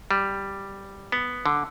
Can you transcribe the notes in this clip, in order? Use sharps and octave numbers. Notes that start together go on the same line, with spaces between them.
G3
B3
D3